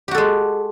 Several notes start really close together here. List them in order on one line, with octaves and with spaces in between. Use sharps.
G4 F#4 A4 G#3